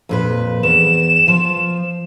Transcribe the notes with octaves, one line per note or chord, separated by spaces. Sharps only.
F2 A#2 B4
E2 E7
F3